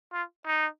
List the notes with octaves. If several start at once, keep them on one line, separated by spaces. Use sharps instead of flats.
F4
D#4